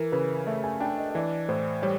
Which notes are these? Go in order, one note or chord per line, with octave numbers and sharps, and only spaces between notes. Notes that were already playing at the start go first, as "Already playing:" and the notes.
Already playing: E3 A#4
C#3 B4
A3 E5
G#5
D4 G5
D#5
D#5
E3 D5
A2 C5
G3 C#5